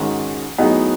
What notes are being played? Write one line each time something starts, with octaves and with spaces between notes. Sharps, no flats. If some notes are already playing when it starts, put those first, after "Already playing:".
Already playing: G#2 D#3 G#3 C#4 F#4
A2 F#3 B3 D#4 G#4